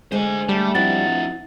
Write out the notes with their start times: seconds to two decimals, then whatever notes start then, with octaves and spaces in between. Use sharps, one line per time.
0.12 D3 G#3 G#4 C5 G#5
0.49 G3 A3 A5
0.75 F3 C4 D4 E4 F#5 A6